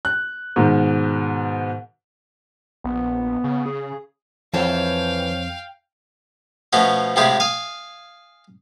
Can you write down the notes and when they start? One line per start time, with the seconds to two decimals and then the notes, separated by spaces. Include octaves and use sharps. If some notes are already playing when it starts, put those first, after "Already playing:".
0.05 F#6
0.56 G#2 B2 D#3
2.84 A#1 B3
3.44 C#3
3.66 G#4
4.54 F2 E3 C5 C#5 F5 G5 A5
6.73 B2 F3 A3 C#4 F4 F#4
7.16 A2 C3 G#3 F4 G4 G#4
7.40 F5 G#5 D#6